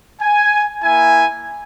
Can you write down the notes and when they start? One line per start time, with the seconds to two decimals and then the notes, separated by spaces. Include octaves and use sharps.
0.22 G#5
0.83 A#3 E4 G#5